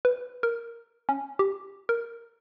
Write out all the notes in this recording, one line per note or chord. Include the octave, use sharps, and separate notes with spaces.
B4
A#4
C#4
G4
A#4